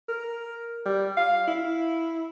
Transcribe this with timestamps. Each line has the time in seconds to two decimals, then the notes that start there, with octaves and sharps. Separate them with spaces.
0.09 A#4
0.86 G3
1.17 F5
1.48 E4